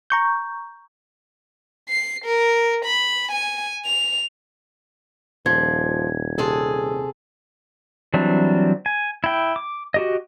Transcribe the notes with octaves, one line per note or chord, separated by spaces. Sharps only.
A#5 C#6 G6
C7
A#4
B5
G#5
F7
D#1 F3 G#6
C3 G#4 A4
E3 F#3 G3 C4 D4
G#5
E4 G5
D6
F#4 G4 D#5